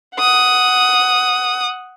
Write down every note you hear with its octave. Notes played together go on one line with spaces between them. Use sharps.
F#5 D#6